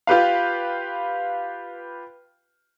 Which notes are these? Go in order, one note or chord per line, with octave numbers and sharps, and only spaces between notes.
F4 G4 B4 F5